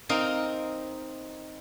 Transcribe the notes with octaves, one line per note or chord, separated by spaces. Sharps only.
C4 D#4 A#4 F5